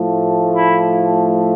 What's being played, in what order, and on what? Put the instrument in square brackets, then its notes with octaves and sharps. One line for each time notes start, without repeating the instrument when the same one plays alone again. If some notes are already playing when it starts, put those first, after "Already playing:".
Already playing: [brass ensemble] A2 F3 A3
E4